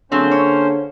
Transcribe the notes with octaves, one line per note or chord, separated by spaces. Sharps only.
D3 F#3 A#3 C4 C#4 G#4 C5 A5
C#5